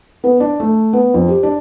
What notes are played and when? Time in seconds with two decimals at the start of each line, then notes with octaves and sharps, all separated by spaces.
0.24 B3
0.40 D4
0.60 A3
0.93 B3
1.14 F2
1.29 G4
1.43 D4